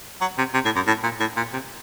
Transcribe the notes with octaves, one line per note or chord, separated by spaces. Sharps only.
F#3
C3
C3
A2
F#2
A2
A#2
A2
A#2
C3